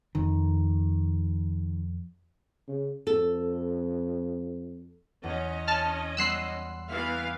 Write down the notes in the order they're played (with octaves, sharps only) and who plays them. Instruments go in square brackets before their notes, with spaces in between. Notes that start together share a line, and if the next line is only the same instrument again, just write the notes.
[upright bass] F2 [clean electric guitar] D#3
[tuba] C#3
[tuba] F2 [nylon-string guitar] A4
[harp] E2 [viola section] C#4 D#5
[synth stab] A5 F6
[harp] G3 B3 C6 [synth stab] E6 F#6 C7
[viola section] E3 B3 F5 [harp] E5